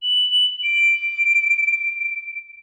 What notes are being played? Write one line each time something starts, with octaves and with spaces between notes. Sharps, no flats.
F#7
D7